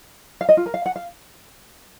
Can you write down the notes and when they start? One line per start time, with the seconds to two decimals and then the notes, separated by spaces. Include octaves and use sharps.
0.41 F5
0.49 D#5
0.57 F4
0.66 A#4
0.74 F5
0.86 F#5
0.96 F5